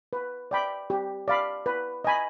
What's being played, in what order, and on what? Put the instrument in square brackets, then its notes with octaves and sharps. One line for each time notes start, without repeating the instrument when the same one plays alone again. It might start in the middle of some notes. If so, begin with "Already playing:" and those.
[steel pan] B4
D5 G5 B5
G4
D5 F5 B5
B4
D#5 G#5 B5